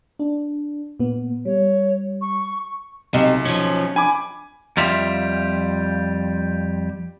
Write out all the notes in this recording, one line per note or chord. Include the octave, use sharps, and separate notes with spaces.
D4
A#2 B3
G3 C#5
C#6
B1 C3 D#5
F3 C#4
D4 G#5 B5 D6
F2 G3 F4 E5